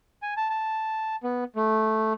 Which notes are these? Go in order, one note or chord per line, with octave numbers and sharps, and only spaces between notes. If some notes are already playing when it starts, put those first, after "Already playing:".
G#5
A5
A5
B3
A3